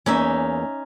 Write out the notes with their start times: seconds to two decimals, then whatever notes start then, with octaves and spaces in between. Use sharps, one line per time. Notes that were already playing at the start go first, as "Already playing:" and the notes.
0.06 E2 A#3 C#4 D#4 E5